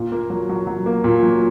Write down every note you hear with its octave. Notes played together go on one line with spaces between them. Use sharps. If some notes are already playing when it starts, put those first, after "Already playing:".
Already playing: A#2
A#3
F#3
F#3
F#3
A#3
A#2
F#3